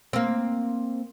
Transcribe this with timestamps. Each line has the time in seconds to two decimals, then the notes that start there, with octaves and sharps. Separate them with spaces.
0.13 A#3 C4